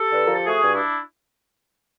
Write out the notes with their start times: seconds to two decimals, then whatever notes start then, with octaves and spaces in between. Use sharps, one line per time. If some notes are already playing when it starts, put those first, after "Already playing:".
Already playing: G4 A4
0.10 D3 B4
0.24 F3 A#4
0.35 A4
0.46 A3 F#4 G#4
0.64 G2
0.73 D4 E4